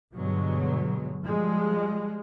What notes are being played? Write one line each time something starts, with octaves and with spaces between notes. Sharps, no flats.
G2 B2 D3 F#3 G#3
F3 G3 G#3